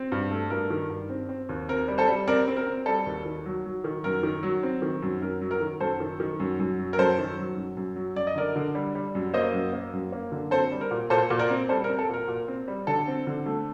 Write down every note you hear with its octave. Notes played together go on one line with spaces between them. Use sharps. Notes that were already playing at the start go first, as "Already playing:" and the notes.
Already playing: C4
G2
A3
G2 A#4
D#3
G2
C4
C4
D#2
C4 A#4
G3
A4 C5
G3
C4 A#4 D5
C4
A#4
C4
G3 A4
D#2
D#3
F#3
F#3
D#3
F#2 A#4
D#3
F#3
C4
D#3
F#2
F#2 A#4
F#3
A#4
D#3
F#2 A4 C5
D#3
D#3
F#2
F#2
F#3
A#4
F#2 A4 C5
D#3
F#3
F#2
F#2
F#3
F#2 D5
D#5
D3 A#4 D5
D3
G3
G3
F#2
A#3 C5 D#5
F#2
A#3
F#2
A#3
D3
C4 A4 C5
G3
A#4
A#2
A#2 A4 C5
A#2
A#4 D5
C4
G3 A4 C5
A#4
C4
A4
A#2 A#4
A#2
C4
G3
D3 A4
C4
D3
A3